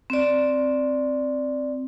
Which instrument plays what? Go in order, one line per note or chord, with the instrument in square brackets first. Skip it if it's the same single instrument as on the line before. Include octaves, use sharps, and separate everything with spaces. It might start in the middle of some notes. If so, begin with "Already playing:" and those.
[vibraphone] C4 D5